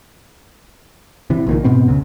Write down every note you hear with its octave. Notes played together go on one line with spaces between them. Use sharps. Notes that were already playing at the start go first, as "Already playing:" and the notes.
C3 E3
A#1 A#2 D#3
G#2 B2 B3 C4
F1 C#2 C#3